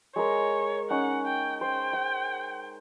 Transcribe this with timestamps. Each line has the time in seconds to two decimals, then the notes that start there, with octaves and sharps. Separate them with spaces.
0.16 G#3 A#4 C#5
0.90 C#4 D#4 F#5
1.26 G5
1.61 C5 G5
1.93 C6